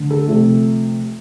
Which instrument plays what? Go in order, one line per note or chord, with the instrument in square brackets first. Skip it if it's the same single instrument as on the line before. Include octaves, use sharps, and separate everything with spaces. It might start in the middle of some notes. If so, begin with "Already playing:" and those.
Already playing: [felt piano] D2 D3 D4
A4
C3 F3 A3